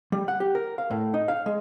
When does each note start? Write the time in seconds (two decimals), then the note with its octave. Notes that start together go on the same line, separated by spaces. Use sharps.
0.12 G3
0.28 F#5
0.40 G4
0.55 A#4
0.78 F5
0.91 A2
1.14 D#4
1.28 F5
1.46 G#3